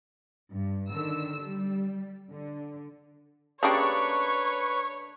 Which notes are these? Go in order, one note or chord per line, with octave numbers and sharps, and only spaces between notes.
G2
D3 D#3 E6
G3
D3
C#3 A3 A#3 D4 G4 B4 C#5 C#6